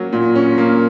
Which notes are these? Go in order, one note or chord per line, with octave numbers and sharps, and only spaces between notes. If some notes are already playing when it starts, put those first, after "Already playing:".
Already playing: F#3 A#3 C#4
A#2
C#4
A#3